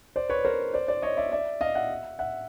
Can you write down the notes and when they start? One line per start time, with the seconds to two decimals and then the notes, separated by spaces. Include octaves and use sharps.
0.16 C5 D5
0.29 B4 C#5
0.45 A#4 C5
0.74 C5 D5
0.88 C5 D5
1.02 C#5 D#5
1.17 D5 E5
1.32 D5 E5
1.61 D#5 F5
1.75 E5 F#5
2.19 E5 F#5